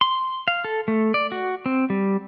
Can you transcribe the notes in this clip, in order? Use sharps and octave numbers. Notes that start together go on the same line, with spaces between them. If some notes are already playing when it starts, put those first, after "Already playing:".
C6
F5
A4
A3
D5
F#4
C4
G3